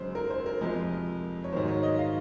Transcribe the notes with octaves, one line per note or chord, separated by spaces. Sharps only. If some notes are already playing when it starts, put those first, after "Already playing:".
Already playing: F#2 C#3 G#3 C5
A#4
C5
A#4
F2 C3 F3 G#3
C#5
G#2 D#3 F#3 C5
C#5
D#5
F5